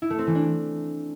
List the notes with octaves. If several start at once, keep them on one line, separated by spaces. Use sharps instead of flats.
E4
A3
C4
E3
D4